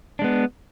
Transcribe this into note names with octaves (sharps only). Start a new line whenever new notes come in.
G#3 B3 D4